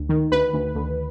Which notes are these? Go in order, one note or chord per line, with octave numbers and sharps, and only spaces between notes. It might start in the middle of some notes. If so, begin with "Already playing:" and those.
Already playing: D2
D#3
D2 B4
D2
D2